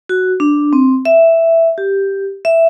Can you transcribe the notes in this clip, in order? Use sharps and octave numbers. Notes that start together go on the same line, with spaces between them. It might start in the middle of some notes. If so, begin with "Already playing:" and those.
F#4
D4
C4
E5
G4
E5